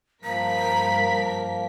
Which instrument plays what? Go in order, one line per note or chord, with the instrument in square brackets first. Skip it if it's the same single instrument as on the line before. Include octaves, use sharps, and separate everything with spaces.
[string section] G2 A#4 B6 [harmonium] F3 A#3 [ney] A#5 [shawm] B5